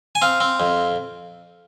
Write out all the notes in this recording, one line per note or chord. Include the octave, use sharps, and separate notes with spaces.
G#5
C4 F5
C4
F2